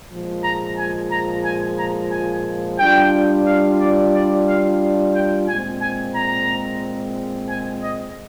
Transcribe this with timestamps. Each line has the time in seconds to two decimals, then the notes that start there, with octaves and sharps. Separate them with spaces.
0.11 A#2 F3 G#3
0.44 A#5
0.78 G#5
1.11 A#5
1.45 G#5
1.78 A#5
2.12 G#5
2.79 G3 D4 F4 G5
3.46 F5
3.80 D5
4.14 D5
4.47 F5
5.14 G5
5.48 A#2 G#3 C4 G#5
5.81 G#5
6.15 A#5
7.49 G#5
7.83 D#5